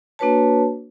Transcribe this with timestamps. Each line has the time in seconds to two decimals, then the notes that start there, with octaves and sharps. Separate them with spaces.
0.19 A#3 D4 F#4 B4 C#5 A5